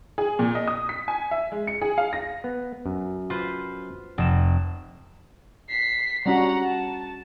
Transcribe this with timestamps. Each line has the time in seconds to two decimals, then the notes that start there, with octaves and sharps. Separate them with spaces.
0.18 G#4
0.39 A#2
0.55 D#5
0.68 D#6
0.89 B6
1.08 G#5
1.31 E5
1.52 G#3
1.67 C#7
1.81 G#4
1.98 F5
2.13 A#6
2.44 B3
2.86 F#2
3.30 F4 B4 C5
4.18 F1 E7
5.69 B6 C7
6.26 G3 C#4 F#4 F#5 A#5
6.65 A5